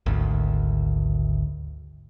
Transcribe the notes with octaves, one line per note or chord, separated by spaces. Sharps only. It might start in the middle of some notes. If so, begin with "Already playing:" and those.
G#1 D2